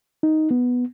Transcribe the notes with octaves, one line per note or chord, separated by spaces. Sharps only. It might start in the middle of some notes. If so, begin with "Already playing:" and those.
D#4
B3